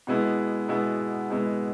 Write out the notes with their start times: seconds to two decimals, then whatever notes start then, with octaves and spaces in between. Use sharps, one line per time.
0.07 B2 G#3 B3 E4
0.69 B2 G#3 B3 E4
1.30 B2 G#3 B3 E4